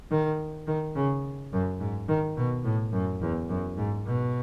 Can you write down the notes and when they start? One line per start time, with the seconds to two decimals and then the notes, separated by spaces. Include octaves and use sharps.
0.11 D#3
0.67 D#3
0.95 C#3
1.53 F#2
1.80 G#2
2.09 D#3
2.37 B2
2.64 A2
2.93 F#2
3.21 E2
3.49 F#2
3.77 G#2
4.06 B2